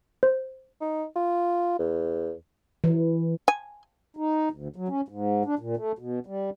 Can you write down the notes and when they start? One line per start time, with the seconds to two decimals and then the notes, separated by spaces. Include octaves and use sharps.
0.23 C5
0.81 D#4
1.16 F4
1.79 E2
2.84 E3
3.48 G#5
4.17 D#4
4.51 D2
4.76 F#3
4.88 C#4
5.09 G#2
5.45 D4
5.59 A#2
5.77 A3
5.99 B2
6.27 G3